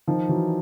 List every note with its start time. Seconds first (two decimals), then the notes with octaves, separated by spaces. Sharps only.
0.07 D#3 F3
0.29 E3 F#3